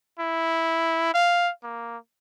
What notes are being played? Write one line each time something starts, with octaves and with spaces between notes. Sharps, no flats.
E4
F5
A#3